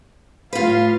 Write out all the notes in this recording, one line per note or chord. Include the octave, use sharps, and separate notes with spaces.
A2 F4 B4 F5